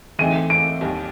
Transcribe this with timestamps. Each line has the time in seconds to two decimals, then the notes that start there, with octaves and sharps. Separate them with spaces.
0.19 E3 A3 C4 D#4 G#4 D#7
0.50 D7
0.81 D#2 D#3 G3